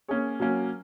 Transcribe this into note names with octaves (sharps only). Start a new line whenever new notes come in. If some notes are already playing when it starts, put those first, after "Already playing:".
A#3 C#4 G#4 C#5
F#3 A#3 C#4